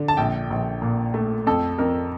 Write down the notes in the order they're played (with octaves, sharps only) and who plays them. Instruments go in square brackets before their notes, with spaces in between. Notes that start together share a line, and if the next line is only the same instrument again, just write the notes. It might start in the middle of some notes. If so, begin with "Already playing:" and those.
Already playing: [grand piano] D3
A5
A#1 G5
A#1
A#2
A3
F2 A4
F2 A#4